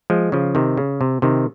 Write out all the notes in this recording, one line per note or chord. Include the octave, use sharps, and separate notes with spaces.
F3 G#3
C#3 F3
C3 D#3
C#3
C3
C3 D#3